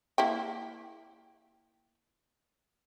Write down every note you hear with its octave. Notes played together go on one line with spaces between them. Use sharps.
A#3 E4 G5